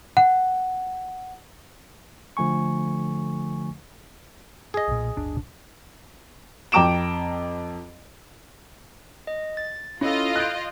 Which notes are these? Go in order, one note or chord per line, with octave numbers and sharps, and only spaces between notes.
F#5
D3 F3 A3 G#5 C#6
G#4 D#5
B1 A#2
D1 G1 D4
F2 G5 A#5 D6 D7 E7
D#5
A6
C#4 E4 F4 A4 D#5
F#6 G6 D7